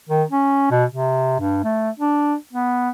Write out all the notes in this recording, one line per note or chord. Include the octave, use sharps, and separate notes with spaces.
D#3
C#4
B2
C3
G2
A3
D4
B3